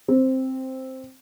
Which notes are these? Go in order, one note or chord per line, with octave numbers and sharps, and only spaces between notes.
C4